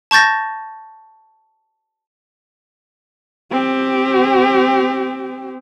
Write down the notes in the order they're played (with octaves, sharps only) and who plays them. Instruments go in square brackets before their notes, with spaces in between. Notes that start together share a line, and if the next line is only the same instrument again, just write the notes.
[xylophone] A5 C#6 G6 A6 A#6
[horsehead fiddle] C4 G4